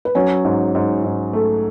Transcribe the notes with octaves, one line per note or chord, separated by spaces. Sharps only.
B4
F#3 C#4 C#5
G#2
G#2
G#2
A3